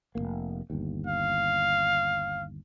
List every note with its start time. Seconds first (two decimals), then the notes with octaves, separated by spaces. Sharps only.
0.15 F1 F#2 A#3
0.70 G1 D#2
1.07 F5